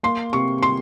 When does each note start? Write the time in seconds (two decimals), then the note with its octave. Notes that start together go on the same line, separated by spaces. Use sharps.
0.03 A#3 C6
0.33 C3 C#6
0.63 C6